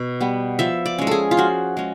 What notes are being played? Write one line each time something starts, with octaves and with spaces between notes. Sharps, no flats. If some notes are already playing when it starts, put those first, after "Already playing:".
Already playing: B2
G3 B3
F3 E5
D5
G#3 C#4
G#4 A4
F4
F3 F#4
G#3 C#4